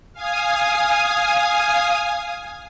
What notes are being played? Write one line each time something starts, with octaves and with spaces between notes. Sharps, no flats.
F5 G#5 D#6